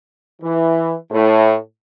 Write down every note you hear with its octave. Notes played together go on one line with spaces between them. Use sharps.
E3
A2